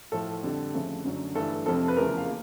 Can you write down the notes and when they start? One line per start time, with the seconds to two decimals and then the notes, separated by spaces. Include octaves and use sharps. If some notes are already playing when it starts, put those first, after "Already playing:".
0.12 A2 F3 A3 A4
0.43 F2 D3 G3
0.74 F2 C#3 F3 A3
1.04 F#2 D3 F#3
1.35 G2 E3 A3 A4
1.66 F2 C3 F3 A4
1.88 B4
1.97 E2 C#3 F3 A3 A#4
2.18 F5
2.27 A#3